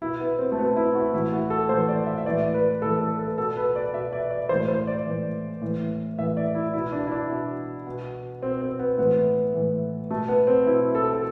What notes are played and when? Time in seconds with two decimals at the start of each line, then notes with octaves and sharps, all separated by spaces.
0.01 B2 E4
0.20 B3
0.39 C4
0.52 A3
0.58 B2 B3
0.76 E4
0.95 F#4
1.13 A2 E3 E4
1.33 F#4
1.50 A4
1.69 A2 E3 C5
1.88 D5
2.06 E5
2.18 E5
2.26 A2 E3 D5
2.54 B4
2.82 A2 E3 A4
3.00 A4
3.19 A4
3.38 B2 A4
3.57 B4
3.76 D5
3.94 B2 E5
4.13 D5
4.31 D5
4.49 A2 E3 C5
4.68 C5
4.87 D5
5.06 A2 E3
5.62 A2 E3
6.18 A2 E3 E5
6.37 D5
6.55 E4
6.73 B2 E4
6.92 D4
7.07 E4
7.12 D4
7.30 B2
7.86 B2
8.42 B2 C4
8.61 C4
8.79 B3
8.98 A2 E3 B3
9.54 A2 E3
10.10 B2 A3
10.28 B3
10.47 C4
10.67 B2 E4
10.95 A4
11.13 A4